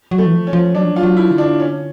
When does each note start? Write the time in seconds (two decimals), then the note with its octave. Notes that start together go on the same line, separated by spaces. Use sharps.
0.11 F#3
0.18 A3
0.25 E3
0.33 F3
0.47 C#4
0.53 F3
0.74 F#3 D4
0.83 F3
0.92 F#3
0.96 F4
1.03 F#3
1.17 E4
1.31 D3
1.38 D4
1.60 C#4